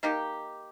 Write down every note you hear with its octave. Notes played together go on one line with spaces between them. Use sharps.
D#3 A#3 D#4 G4